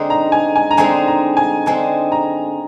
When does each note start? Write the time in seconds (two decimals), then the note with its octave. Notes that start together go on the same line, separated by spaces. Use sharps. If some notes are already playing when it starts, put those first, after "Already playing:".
Already playing: D3 G#3 C4 D#4
0.10 A#5
0.32 G#5
0.56 G#5
0.71 A#5
0.77 D3 G#3 C4 D#4 G#5
1.07 A#5
1.37 G#5
1.66 D3 G#3 C4 D#4 G#5
2.12 A#5